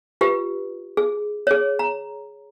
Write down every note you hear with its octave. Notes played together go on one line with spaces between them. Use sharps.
F4 G4 B4
G#4
G#4 C#5
A#5